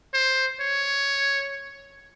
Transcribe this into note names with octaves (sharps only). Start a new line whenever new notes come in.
C5
C#5